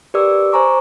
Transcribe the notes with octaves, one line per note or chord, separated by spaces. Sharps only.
G4 A#4 B4 D5 D6 E6
C5 G#5 A#5 C#6 D6